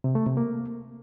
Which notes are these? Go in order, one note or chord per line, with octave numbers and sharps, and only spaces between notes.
C3
A3
C3
A#3